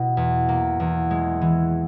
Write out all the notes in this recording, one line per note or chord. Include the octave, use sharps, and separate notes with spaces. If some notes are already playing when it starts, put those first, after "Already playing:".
Already playing: B2 E4
E2
A#3
E2
G#3
E3